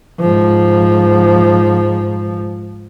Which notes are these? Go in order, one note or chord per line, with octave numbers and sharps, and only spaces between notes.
G#2 F3